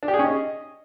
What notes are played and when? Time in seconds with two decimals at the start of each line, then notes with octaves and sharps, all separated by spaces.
0.03 D4
0.08 G4
0.14 G#4
0.19 C#4
0.25 D#5